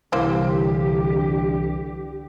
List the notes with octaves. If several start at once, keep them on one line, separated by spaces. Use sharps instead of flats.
C2 D3 E3 F#3 A#3 G4 C5